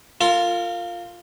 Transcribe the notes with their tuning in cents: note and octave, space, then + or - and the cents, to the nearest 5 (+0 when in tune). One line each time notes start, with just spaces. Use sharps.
F4 +0 A#4 -35